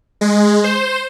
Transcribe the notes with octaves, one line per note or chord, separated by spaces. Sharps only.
G#3
C5